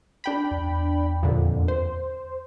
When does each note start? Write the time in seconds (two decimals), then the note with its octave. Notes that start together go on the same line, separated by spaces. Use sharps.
0.24 D4 G5 B5
0.51 E2
1.23 F2 A#2 D3
1.68 C5